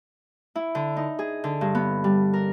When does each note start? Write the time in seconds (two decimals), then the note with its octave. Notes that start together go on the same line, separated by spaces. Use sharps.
0.56 E4
0.75 D3
0.97 D#4
1.19 G#4
1.44 D3
1.61 G2
1.75 B3
2.04 G3
2.34 A#4